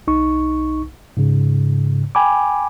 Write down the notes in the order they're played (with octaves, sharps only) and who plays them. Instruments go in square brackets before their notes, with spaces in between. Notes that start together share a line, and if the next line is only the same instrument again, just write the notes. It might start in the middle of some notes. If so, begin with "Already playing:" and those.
[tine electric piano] B1 D#4 C#6
G#2 C#3
G5 G#5 B5 D6